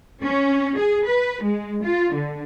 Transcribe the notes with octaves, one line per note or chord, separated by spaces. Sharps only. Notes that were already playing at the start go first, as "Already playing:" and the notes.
C#4
G#4
B4
G#3
F4
D3